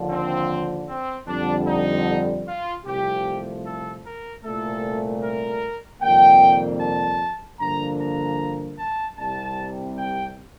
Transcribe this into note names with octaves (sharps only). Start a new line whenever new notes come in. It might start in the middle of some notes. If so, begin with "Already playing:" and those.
Already playing: D#2 D3 F3
C4
C4
F2 D3 G3 D4
D#4
F4
C2 C3 F3 A3 G4
A4
A#4
C2 A#2 A3 A4
A#4
F2 C3 D#3 G3 A#3 G5
A5
G2 D3 F3 A#3 A#5
A#5
A5
C2 C3 G3 A5
G5